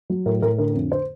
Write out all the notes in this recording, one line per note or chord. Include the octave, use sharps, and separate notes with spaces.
F#3
A2 A#4
A2 A#4
D3 A#4
A#4
F2
C5